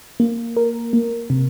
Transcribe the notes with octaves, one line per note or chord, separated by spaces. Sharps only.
A#3
A#4
A#3
C3